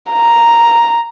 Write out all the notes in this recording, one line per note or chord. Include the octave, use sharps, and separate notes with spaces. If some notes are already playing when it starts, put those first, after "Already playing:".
A#5